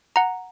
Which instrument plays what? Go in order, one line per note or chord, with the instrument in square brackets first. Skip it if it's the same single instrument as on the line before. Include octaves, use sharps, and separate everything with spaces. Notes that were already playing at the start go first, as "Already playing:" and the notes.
[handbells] F#5 A#5